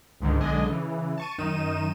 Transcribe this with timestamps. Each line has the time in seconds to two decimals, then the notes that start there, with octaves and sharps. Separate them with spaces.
0.21 C#2 G#2 D3 D#3
0.40 B1 D3 G#3 D4 D#5 G#5
0.65 C#3 E3
1.18 A5 C#6 D#7
1.38 F#2 D#3 D#4 D#7 E7